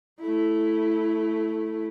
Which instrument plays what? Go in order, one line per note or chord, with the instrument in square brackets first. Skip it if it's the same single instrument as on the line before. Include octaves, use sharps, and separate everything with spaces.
[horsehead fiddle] A3 E4